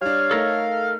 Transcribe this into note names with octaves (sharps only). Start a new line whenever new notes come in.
G3 D4 C#5 F5
A3 D#4 A4 A#4